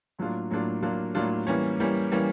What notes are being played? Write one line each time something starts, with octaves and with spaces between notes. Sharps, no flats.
A2 F#3 A#3 D4 F4
A2 F#3 A#3 D4 F4
A2 F#3 A#3 D4 F4
A2 F#3 A#3 D4 F4
E3 G3 A#3 C#4
E3 G3 A#3 C#4
E3 G3 A#3 C#4